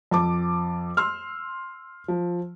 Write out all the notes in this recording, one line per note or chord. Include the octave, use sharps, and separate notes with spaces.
F2 A5 D6
C6 E6 F6
F3